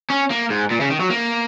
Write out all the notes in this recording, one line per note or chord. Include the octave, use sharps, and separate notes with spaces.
C#4
A#3
G#2
A#2
C#3
D#3
F#3
A#3